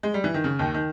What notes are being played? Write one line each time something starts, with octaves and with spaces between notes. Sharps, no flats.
G#3
G3
E3
D#3
C#3
D#2 D#3
D#3